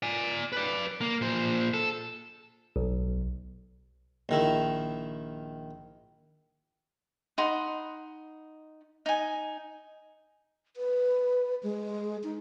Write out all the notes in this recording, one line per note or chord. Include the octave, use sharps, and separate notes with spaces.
D5 G#5
B4 D5
A#3
A#2 C5
A4
B1
A#1 D#3 E4
D#4 F#5 B5 C6
D#4 G#5
B4
G#3
D#4